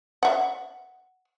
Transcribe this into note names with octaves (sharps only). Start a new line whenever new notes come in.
E5 F#5